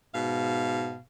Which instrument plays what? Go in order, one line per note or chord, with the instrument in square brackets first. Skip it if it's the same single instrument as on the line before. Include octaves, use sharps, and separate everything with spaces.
[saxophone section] G#2 B2 F5